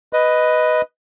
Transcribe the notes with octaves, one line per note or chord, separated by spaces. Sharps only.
B4 D#5